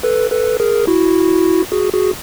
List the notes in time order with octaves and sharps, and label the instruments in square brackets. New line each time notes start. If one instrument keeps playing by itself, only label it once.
[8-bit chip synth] A4 B4
A4 B4
G#4 A#4
E4 F#4
F#4 G#4
F#4 G#4